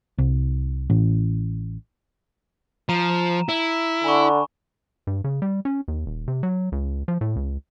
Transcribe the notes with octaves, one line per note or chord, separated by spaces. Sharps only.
C2
A1
F3 A#5 D#7 E7
E4
D3 G#5 B5 C#6
G2
C#3
G3
C#4
D#2
D#1
C3
F#3
C#2
F3
A2
C#2